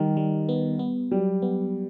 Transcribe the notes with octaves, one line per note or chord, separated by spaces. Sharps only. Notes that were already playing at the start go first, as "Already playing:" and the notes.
Already playing: D#3 G3
G3
B3
B3
F#3 G3
B3